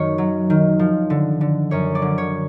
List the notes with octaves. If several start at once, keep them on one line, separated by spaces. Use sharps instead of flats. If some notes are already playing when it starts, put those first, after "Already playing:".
Already playing: F#2 D#3 C#5
F#3
D#3
F3
D3
D3
F#2 C#5
D5
D3
C#5